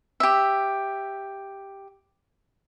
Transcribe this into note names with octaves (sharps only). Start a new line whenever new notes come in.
G4 E5